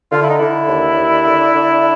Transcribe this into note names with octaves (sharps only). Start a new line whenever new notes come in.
D3 F4
E4
D#4
D3 D4 E4
D#2
D#2
D3
D3